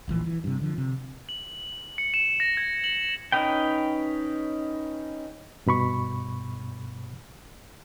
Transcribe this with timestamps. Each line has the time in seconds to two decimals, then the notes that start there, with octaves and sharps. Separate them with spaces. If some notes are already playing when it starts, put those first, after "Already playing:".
0.08 D1 A#1 E3 F3
0.26 E3
0.44 G2 C3
0.61 D3 F3
0.78 C3
1.29 F#7
1.98 C#7
2.14 E7
2.40 A#6
2.57 G#6
2.84 F#7
3.32 C#4 D#4 B4 G5
5.66 G2 B2 B5 C#6